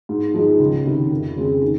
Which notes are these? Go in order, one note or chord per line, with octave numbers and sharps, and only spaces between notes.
G#2
F3 G#3 D#4 G#4
C#2
C3 D#3
F2
C#3 G#3 C4
D#3